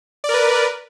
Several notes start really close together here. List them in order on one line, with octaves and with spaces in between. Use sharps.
D5 A#4 B4